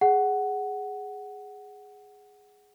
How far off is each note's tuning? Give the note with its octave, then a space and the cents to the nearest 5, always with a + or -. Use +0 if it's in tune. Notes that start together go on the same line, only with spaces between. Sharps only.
G#4 +0 F#5 +10